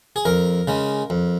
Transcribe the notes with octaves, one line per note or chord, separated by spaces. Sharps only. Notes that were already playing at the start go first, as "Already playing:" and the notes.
G#4
F2 A#4
C#3 G#3
F2